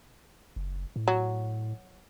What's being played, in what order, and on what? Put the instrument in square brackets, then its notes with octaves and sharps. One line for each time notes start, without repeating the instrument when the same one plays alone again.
[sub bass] F#1
A2
[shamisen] F#3